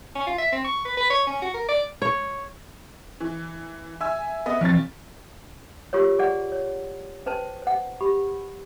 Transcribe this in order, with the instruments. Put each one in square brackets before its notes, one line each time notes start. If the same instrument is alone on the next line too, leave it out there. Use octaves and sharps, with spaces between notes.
[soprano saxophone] C#4
F4
E5
C4
C#6
B4
B4
C#5
C#4
F#4
A#4
D5
[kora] C#5
[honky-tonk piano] E3
E5 G#5 E6
B3 D#5 E5
[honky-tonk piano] B1 A6 [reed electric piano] E3 F3 C4
[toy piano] F4 G4 A#4 C#5
G#4 D5 F#5
C#5
C#4 B4 C5 A5
C5 F#5
G4 B5